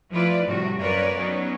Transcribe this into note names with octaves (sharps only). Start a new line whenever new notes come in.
F3 A3 E4 F4 B4 D5
A2 C3 F3 G3 F#4
F#2 A#3 A#4 B4 C#5 D5
F#3 B3 C#4 D#4